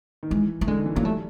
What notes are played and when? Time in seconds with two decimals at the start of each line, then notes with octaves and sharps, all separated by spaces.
0.23 D#3
0.30 E3 G#3
0.61 A3
0.67 D3 G#3
0.78 D#3
0.86 E3
0.96 F#3 A#3
1.04 G3 A3